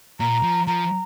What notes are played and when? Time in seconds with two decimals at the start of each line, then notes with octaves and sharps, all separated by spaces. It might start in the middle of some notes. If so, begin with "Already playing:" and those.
0.20 A#2 A#5
0.43 F3
0.67 F3 A#5